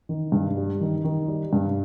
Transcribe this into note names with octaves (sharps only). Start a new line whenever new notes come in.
D#3
G2
G3
D#3
D#3
G3
G2